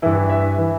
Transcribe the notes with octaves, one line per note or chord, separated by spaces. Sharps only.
G2 E3 E4
E5
E3